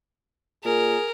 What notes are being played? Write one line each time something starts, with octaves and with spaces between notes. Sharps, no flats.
A#2 G#4 A#4